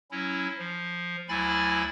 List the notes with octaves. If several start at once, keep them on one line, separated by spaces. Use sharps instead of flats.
F#3 C#4 E4
F3
D2 F#3 E4 G#5 B5 A6